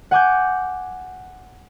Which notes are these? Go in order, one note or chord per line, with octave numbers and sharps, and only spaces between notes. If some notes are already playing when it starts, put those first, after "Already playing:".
F#5 G#5 D6 G6